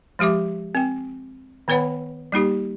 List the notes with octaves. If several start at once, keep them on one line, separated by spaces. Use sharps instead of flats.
F3 G#3 G4 E5 D6
C4 G5
D#3 B3 B4 C#5 F#5 B5
G3 A#3 D#4 G4